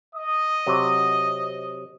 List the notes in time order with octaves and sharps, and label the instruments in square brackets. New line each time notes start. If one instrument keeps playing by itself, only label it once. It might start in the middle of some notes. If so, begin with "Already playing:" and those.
[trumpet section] D#5 D#6
[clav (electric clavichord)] C3 F#3